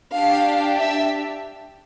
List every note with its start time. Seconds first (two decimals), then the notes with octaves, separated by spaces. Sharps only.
0.14 D4 G4 F5
0.80 E5